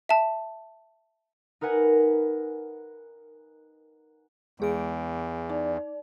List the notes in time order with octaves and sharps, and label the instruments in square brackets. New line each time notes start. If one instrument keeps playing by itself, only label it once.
[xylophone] E5 A5
[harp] D#4 A#4 B4 F#5 G#5
[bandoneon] E2 [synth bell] G#3 G#4 D7
[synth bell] D#4 [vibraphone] D5